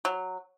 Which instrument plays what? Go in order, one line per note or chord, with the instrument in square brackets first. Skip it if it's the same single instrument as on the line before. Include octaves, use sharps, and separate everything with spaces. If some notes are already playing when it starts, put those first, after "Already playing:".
[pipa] F#3